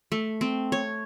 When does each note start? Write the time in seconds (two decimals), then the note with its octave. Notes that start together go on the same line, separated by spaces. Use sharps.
0.12 A3
0.41 C4
0.72 C#5